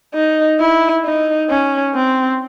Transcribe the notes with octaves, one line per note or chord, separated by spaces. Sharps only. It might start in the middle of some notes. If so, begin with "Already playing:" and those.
D#4
E4
D#4
C#4
C4